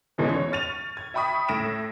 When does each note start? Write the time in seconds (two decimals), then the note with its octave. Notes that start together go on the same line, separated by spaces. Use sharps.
0.18 E2 G#2 B2 E3 G#3 C#4
0.34 C#5
0.52 C#6 F6 A6 D#7 F7
0.97 G#6
1.14 E5 G5 B5 C#6 D#6 B6
1.48 A2 A#6 D7 E7